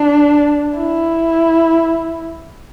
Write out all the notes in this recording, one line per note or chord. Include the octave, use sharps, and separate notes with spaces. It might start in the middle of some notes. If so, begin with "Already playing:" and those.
Already playing: D4
E4